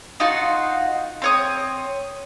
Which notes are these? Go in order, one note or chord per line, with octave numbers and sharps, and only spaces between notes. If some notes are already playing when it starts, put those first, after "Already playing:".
D#4 F4 F#4 C6
C4 C#5 D#6